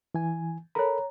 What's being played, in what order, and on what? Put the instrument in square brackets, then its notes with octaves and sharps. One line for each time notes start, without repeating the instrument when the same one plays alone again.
[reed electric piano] E3 G#5
[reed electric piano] A4 A#4 B5 [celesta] C#5 A#5